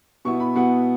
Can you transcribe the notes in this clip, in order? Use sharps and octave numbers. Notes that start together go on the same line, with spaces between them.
B2 B3 E4 C#6
B5
B2 B3 E4 F#5